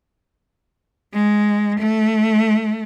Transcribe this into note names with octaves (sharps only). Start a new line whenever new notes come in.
G#3
A3